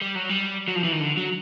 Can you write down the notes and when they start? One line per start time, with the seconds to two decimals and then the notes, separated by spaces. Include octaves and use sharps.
0.02 G3
0.15 F#3
0.29 G3
0.68 F#3
0.76 F3
0.84 E3
0.92 D#3
1.00 D3
1.17 F#3